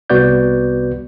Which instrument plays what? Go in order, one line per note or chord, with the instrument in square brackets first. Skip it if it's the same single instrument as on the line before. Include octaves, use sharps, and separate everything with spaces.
[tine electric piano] C2 B3 F#4 B4 D5 G6